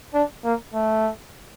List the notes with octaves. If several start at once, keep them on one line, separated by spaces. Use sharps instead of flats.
D4
A#3
A3